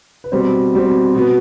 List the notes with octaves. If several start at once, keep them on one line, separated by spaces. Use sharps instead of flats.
B4
B2 G3 C4 C5
B2 G3 C4
B2 B3